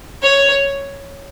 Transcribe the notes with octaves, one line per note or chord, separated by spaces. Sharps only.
C#5